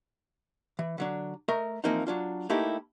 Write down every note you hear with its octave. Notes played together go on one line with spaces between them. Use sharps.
E3
D3 F#3 D4
A3 A#4 D#5 A#5
E3 F3 A#3 C4 D#4
F#3 D4 F4
A3 A#3 D#4 E4 G4